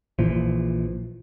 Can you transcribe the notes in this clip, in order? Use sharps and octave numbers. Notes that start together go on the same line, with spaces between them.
A#1 A#2 E3 F3